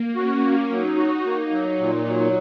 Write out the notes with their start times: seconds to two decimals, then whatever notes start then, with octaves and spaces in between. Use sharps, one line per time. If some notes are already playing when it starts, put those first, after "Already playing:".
Already playing: A#3
0.15 C#4 F#4
0.42 A#3
0.70 F#3 D#4
0.97 F#4
1.24 A#3 D#4
1.51 F#3
1.79 A#2
2.05 F#3